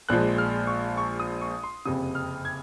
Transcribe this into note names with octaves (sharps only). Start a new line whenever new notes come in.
A#1 A#2 F3 G#3 F#6
F6
C#6
C#6
D#6
C#6
C6
F#1 F2 C3 D#6
F6
G#6